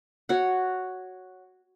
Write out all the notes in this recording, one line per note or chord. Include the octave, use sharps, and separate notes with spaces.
F#4 C#5 F#5